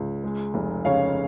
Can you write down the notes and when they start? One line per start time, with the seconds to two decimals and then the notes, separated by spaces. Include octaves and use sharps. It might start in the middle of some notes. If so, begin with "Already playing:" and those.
Already playing: C#2
0.24 G#3
0.54 F1
0.85 C#3 C#5 F5